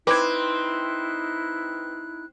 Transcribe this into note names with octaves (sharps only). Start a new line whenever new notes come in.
C4 D#4 E4 B4 D6 F#6 G#6